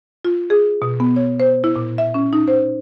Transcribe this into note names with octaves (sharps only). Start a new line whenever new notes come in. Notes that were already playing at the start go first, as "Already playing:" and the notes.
F4
G#4
B2
B3
C#5
C5
E4
A#2
E5
C#4
D#4
C5